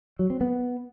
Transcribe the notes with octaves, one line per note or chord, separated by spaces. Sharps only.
F#3
C4
B3